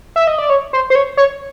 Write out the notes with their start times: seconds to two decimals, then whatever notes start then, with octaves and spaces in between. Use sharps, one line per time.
0.16 E5
0.27 D#5
0.38 D5
0.50 C#5
0.73 C5
0.90 C5
0.95 C#5
1.17 C#5